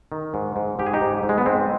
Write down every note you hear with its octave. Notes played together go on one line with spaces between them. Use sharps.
D#3
G#2
G#2
G#2 G4
G#4
D#4 G4
G#2
G#2
G#3
B3
G#2 G#3 C4